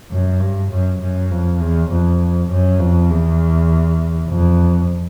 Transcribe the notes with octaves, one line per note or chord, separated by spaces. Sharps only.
F#2
G2
F#2
F#2
F2
E2
F2
F#2
F2
E2
F2